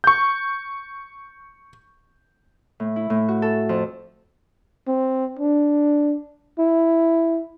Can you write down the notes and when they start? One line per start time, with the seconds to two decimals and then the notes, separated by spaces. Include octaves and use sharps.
0.04 C#6 G6
2.80 A2
2.96 E4
3.10 A2
3.28 F#4
3.42 A4
3.69 F2
4.87 C4
5.39 D4
6.59 E4